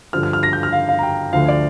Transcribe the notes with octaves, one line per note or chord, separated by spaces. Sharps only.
G2 D3 F3 F6
F6
F6
A#6
G6
F6
F5
F5
A#5
G5
D2 D3 F3 F5
D5